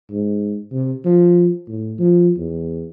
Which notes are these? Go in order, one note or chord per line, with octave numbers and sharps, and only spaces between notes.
G#2
C3
F3
A2
F3
E2